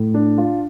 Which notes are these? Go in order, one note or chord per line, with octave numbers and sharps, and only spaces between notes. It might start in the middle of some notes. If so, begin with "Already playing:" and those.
Already playing: A2
D4
F4